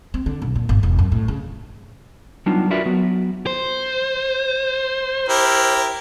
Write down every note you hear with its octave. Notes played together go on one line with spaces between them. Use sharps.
C4
D3
B1
A#2
G1
E1
F#2
A2
C#3
F#3 G3 B3 D4 D#4 F4
F4 F#4 A#4 B4 D5 E5
F#3 B3 F#4
C5
E4 G4 A#4